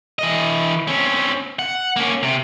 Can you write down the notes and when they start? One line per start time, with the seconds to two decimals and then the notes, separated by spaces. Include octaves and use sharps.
0.19 E3 D#5
0.87 C4 C#4
1.59 F#5
1.96 A#3 C#4
2.23 C3